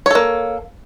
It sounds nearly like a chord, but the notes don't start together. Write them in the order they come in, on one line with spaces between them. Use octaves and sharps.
C#5 A4 A#3